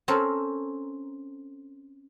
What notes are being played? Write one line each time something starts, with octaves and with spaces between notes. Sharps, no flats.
C4 C#4 A4 A#4 C5 C#5